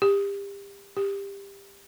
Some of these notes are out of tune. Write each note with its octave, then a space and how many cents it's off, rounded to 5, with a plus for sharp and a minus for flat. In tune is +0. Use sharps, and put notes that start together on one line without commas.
G4 +30
G4 +20